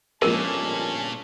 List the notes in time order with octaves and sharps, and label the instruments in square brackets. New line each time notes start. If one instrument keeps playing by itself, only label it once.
[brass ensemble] G1 C#4 A5 [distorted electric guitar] A#2 [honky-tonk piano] F3 G#3 A#3 [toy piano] A#4